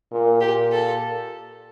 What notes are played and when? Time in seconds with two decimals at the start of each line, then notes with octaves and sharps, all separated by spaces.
0.12 A#2
0.41 A#2 G4
0.72 A4